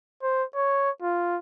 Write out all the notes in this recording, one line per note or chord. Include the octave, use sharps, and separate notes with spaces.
C5
C#5
F4